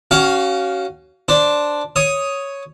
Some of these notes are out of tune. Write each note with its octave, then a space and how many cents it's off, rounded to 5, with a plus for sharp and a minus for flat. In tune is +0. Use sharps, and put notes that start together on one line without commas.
C#4 +0 F#4 +30 F5 +0
D4 +0 C5 +0
C#5 +0 D#6 +5